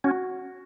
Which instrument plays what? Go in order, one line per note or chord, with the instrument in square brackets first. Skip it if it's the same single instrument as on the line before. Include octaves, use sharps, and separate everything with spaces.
[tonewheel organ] C#4 [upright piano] F#4